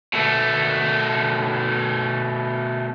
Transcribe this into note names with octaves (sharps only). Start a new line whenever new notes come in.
B2 A3